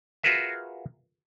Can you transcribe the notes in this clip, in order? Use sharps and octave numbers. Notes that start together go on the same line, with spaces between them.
F4 F#4 G#4 A#4 B4 E5